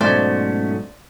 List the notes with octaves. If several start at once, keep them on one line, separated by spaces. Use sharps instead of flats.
G#2 B2 F#3 A3 C#4 C5 D5